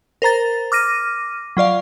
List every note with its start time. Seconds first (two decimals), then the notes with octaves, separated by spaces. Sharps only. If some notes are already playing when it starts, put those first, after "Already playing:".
0.22 A#4 C5 A#5 A6
0.72 D6 F6 A#6 D#7
1.57 F#3 F4 D5 F5